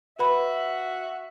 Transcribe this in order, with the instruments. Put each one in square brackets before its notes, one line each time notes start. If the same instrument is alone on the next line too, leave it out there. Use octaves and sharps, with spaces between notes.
[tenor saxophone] F#4 [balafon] B4 B5 [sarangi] E5